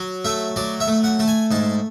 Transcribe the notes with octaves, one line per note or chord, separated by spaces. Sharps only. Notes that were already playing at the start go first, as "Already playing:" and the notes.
Already playing: F#3
A3 E5
F#3 D5
E5
A3
F#5
A3 A5
G#5
G#2 A5